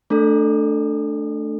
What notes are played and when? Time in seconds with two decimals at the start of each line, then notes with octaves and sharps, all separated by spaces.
0.10 A3 D4 A4